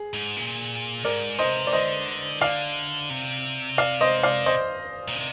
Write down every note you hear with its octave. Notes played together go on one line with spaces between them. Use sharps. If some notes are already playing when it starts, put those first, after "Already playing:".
Already playing: G#4
G#2
A#2
G#2 A#4 D5
C3 C5 D#5
D5
D3 C5 D#5
D3 D5 F5
C3
D5 F5
C5 D#5
D5 F5
C5 D#5
A#2
C3